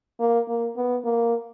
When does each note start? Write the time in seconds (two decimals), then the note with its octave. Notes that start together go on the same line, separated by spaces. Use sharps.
0.20 A#3
0.48 A#3
0.76 B3
1.05 A#3